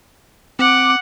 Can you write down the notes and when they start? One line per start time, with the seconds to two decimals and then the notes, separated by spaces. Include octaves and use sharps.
0.59 C4 F#5 D6